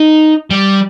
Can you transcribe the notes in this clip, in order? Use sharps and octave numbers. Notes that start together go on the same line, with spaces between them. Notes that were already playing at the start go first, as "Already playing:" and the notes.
Already playing: D#4
G3